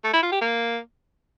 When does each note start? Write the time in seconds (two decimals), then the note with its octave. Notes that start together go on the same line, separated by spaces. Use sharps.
0.04 A3
0.13 E4
0.23 F4
0.32 G4
0.41 A#3